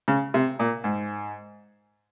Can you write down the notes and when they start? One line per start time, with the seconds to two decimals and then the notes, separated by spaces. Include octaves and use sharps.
0.08 C#3
0.34 C3
0.59 A#2
0.84 G#2